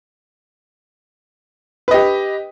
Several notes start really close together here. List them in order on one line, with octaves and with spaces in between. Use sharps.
B4 D#5 G4